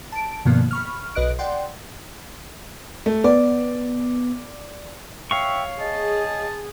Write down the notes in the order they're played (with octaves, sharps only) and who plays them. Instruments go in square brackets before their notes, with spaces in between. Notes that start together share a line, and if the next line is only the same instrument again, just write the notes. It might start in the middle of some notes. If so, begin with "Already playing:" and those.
[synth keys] A5 D7
G2 B2 D#3 F3 A#3 B3
B5 C#6 F6
B1 B4 D#5 F#6 D7
D5 F#5 G5 C6
[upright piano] A3
[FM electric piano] B3 [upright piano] D5
[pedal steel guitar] C#5 F5 C#6 [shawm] E5 [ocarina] G5
[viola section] G#4 [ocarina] D#5 [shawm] A5